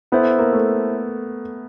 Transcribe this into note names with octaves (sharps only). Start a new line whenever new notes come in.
B3 E4 A4 C5 E5
A#3
A3